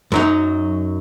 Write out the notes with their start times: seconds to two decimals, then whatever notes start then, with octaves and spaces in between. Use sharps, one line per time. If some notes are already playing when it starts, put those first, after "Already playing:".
0.12 F#2 F#3 D#4